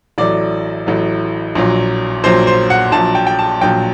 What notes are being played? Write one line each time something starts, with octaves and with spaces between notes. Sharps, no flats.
A1 A2 F#3 D5
A1 A2 F#3
A#1 A#2 F#3
A#1 A#2 F#3 C5
C5
F#5
A#1 A#2 F#3 A5
G5
G5
A5
A#1 A#2 F#3 G5